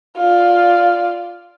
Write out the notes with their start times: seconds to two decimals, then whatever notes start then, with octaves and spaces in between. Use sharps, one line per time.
0.17 F4 D5